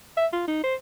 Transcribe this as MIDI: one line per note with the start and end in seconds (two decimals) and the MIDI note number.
0.17 0.27 76
0.33 0.47 65
0.48 0.60 63
0.64 0.75 72